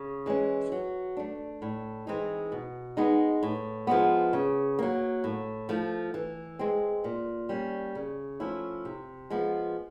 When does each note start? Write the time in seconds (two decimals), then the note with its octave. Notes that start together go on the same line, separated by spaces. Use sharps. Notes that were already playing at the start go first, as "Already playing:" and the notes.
Already playing: C#3
0.26 E3 G#3 C#4
0.72 F#3
1.17 A3 D4
1.62 A2
2.07 E3 G#3 C4 D#4
2.52 B2
2.97 G#3 B3 D#4
3.43 A2
3.87 F3 G#3 B3
4.33 C#3
4.79 F#3 A#3
5.24 A2
5.69 F3 A3
6.14 E3
6.59 G#3 C4
7.04 A#2
7.49 G3 A#3 C#4
7.95 C#3
8.40 F3 A3 C#4 E4
8.85 C3
9.30 F3 G#3 B3